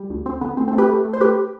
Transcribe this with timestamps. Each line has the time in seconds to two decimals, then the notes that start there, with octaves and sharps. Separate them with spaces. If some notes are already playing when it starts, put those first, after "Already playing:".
Already playing: G3
0.10 D2
0.26 D2 C4
0.41 D3 B3
0.57 A3 C4
0.68 C4
0.73 A3
0.78 G4 B4
0.89 A3
1.05 A3
1.13 C5
1.20 A3 G4 B4